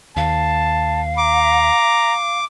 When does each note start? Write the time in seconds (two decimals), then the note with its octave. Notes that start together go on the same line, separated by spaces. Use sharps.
0.17 D#2 F5 A5
1.17 A#5 D6